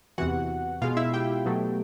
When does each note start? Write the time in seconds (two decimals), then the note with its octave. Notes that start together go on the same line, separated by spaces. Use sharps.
0.18 E2 C3 E3 F#4 F#5
0.82 B2 G#3 F4 F5
0.97 E4 E5
1.14 G4 G5
1.45 B2 F#3 A3